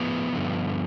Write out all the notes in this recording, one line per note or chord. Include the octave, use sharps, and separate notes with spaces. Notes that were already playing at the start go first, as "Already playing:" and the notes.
Already playing: A2 F3 B3
G2 D3 F3